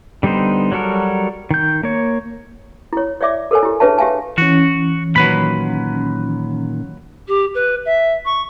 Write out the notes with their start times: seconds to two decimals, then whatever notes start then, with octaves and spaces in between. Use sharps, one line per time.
0.23 D3 G3 B3 D#4 C5
0.72 F#3 G3 F#4 A4 A#4
1.51 D#3 G6
1.83 A#3 C#5
2.93 E4 C#5
3.21 C#5 D5 E5 D6
3.51 A4 A#4 C5 C#5 G#5
3.63 E4 G4
3.80 D4 G#4 B4 C#5 E5 A5
3.98 G4 C#5 E5 F5 G#5 A5
4.38 E3 C#4 F#4
5.16 A#2 D#3 F#3 B4 B5
7.28 G4
7.55 B4
7.85 E5
8.25 C#6